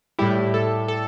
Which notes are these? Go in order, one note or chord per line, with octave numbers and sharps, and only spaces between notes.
A2 G3 E4 G4
A4
A4